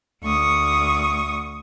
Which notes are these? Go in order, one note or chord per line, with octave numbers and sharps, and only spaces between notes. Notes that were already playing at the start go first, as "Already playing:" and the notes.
D2 C#6 D#6